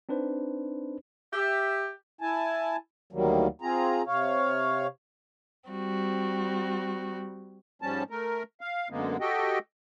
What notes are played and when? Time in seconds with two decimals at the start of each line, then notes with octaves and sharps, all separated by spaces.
0.09 C4 D4 D#4 B4 C5
1.33 G4 E5
2.21 E4 G#5 A5
3.13 D2 D#3 F#3 G3 A#3
3.62 C4 F4 G#4 A#5
4.07 C3 C#5 F5
5.69 G3 C4 F#4
7.82 G#2 F3 G3 C#4 A5
8.10 A3 A#4
8.61 F5
8.90 F#2 D3 G#3 A#3 B3
9.21 F#4 G4 A4 D#5 G5